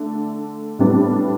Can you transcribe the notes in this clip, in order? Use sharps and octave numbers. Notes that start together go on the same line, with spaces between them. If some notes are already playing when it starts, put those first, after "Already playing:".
Already playing: D3 A3 D4
A2 G3 B3 D4